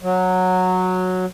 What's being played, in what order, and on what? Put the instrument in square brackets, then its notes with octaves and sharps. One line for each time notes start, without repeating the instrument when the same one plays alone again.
[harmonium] F#3